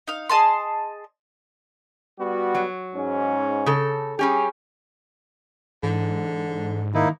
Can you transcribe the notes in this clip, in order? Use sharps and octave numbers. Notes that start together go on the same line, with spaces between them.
D#4 F5
G#4 D#5 A5 C6
G3 B3 F#4
F#3
G#2 C#4
C#3 A4
G3 C#4 G4 G#4
G#2 D3 E3
D#3 A#3 D#4 E4